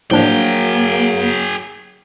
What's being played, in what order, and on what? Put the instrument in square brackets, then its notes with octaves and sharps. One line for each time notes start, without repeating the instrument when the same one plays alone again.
[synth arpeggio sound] A2 F3 D4 [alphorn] F#3 [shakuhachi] A#3 [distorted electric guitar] G#4 G5